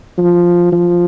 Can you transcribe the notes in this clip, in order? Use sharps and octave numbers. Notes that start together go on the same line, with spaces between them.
F3
F3